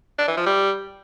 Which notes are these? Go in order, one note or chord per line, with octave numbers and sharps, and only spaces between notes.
D4
E3
F3
G3